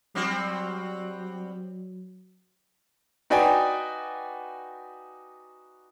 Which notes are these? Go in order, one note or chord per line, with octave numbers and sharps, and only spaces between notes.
F#3 G3 C4 F#4
D#4 F#4 B4 D5 G5 G#5